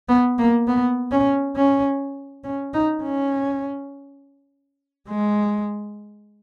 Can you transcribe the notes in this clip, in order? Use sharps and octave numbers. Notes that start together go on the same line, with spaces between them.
B3
A#3
B3
C#4
C#4
C#4
D#4
C#4
G#3